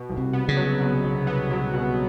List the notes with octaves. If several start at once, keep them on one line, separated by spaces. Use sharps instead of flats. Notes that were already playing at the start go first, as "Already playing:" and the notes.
Already playing: B2
C2
C3
B3
C#3
F#3
B2
C2
B3
F#3
B2